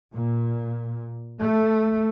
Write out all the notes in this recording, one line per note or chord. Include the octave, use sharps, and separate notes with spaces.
A#2
A3